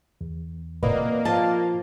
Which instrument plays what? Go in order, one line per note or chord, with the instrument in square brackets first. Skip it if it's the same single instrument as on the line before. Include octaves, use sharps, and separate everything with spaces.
[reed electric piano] E2
[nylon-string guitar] E2 [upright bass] A#2 C4 [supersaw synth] A#3 [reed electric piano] B4 D5 D#5
[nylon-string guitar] F3 F4 A5